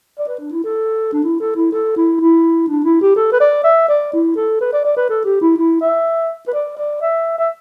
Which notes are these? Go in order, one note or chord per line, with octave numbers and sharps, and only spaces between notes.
D5
B4
D4
E4
A4
D4
E4
A4
E4
A4
E4
E4
D4
E4
G4
A4
B4
D5
E5
D5
E4
A4
B4
D5
D5
B4
A4
G4
E4
E4
E5
B4
D5
D5
E5
E5